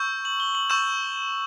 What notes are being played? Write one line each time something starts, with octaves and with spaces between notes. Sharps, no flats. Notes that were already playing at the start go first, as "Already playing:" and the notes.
Already playing: C#6 E6 G6
F#7
G7
F#7
C#6 E6 G6 E7